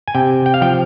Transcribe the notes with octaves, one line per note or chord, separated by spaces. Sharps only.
G#5
C3 G5
G5
F5
F3 G5